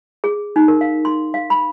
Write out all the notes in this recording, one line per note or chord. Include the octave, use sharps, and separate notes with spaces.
G#4
D#4
A#4
F5
C6
F5
B5